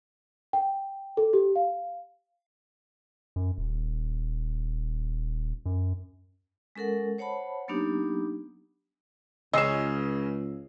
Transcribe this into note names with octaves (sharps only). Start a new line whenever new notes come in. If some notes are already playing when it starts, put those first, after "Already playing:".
G5
A4
G4
F5
F#2
D#1
F#2
G#3 C#4 A4 A#4 F#5
C5 C#5 F#5 A5 B5
F#3 A#3 B3 D4 D#4 G4
C#2 C#3 G#3 C#4 D#5 E6 C7 E7